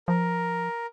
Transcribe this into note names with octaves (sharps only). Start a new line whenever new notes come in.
F3 A#4